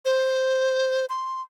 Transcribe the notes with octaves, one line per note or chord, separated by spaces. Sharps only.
C5
C6